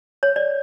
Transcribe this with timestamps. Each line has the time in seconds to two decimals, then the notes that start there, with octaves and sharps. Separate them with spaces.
0.23 C#5
0.36 D5